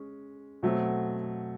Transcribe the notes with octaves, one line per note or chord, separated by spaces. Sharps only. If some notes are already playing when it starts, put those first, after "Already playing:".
Already playing: G#3 C#4
B2 F#3 A3 C4